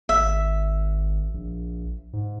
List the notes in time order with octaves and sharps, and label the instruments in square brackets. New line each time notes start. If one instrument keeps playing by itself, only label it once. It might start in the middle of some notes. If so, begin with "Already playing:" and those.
[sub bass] G#1 [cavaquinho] E5
[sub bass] A#1
G#2